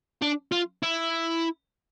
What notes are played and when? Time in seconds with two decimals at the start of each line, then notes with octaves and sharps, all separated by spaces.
0.22 D4
0.52 F4
0.83 E4